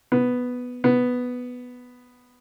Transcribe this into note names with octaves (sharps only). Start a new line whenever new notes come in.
B3
B3